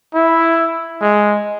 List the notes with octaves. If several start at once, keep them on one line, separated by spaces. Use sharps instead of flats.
E4
G#3